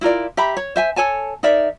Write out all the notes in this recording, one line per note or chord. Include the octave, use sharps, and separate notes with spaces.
E4 F4 A#4 D5
G4 E5 A#5 B5
C#5
C5 E5 G#5
A4 C#5 G#5 A5
D#4 A#4 D5 E5